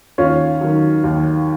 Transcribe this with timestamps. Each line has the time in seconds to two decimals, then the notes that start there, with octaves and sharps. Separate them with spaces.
0.18 D#2 C#4 F4
0.61 D#3 F#3
1.04 D#2